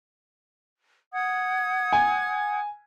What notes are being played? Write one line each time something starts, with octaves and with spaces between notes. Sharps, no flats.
F#5 D#6 G#6
G#5